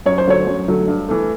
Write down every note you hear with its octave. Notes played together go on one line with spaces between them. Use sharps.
F#2 C#5
C5
D3 F#3 A3 C#5
F#2
D3 F#3 A3
G2
E3 A3